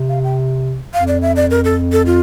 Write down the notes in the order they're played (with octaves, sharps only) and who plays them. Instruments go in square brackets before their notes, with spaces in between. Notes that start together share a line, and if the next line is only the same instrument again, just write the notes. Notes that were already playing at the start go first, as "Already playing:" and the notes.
Already playing: [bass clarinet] C3
[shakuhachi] F5
G5
[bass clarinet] F2 [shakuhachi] F5
[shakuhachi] D5
E5
D5
A#4
A4
A4
F4